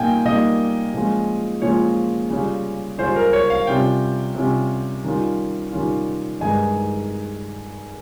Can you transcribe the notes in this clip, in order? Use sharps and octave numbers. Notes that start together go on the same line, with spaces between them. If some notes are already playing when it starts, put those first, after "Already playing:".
Already playing: A#2 G3 A#3 D#4 G5 G#5
A#2 G3 A#3 D#4 D#5
A#2 F3 G#3 C#4 F4
A#2 F3 G#3 C#4 F4 C#5
C#3 G3 C#4 F4
C#3 G3 C#4 F4 C5
A#4
C#5
F5
C3 G3 C#4 F4 G5
C3 G3 C#4 F4
D#3 G3 C#4 F4
D#3 G3 C#4 F4
G2 D#3 G#3 D#4 G#5